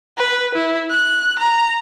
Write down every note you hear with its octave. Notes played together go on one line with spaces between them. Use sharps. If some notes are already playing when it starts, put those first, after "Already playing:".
B4
E4
F#6
A#5